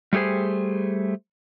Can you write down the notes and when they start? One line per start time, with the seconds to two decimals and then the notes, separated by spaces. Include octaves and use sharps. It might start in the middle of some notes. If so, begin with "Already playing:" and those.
0.13 G3 A3 G4 G#4 C5